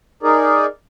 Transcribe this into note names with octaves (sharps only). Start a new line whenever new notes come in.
D#4 G#4 A#4 D5